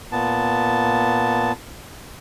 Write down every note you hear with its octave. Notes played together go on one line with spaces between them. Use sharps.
A#2 B3 A5